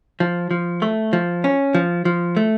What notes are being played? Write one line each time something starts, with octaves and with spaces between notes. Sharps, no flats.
F3
F3
A3
F3
C#4
F3
F3
A3